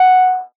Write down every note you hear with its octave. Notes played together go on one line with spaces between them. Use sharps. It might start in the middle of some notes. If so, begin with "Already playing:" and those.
Already playing: F#5